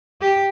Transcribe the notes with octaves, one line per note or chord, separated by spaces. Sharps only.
G4